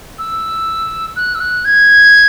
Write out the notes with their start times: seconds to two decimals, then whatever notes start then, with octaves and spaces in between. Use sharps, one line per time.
0.19 E6
1.16 F#6
1.35 E6
1.40 F#6
1.65 G#6